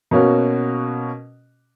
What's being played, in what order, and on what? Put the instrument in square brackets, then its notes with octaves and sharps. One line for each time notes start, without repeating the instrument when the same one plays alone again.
[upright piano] B2 A#3 C#4 F#4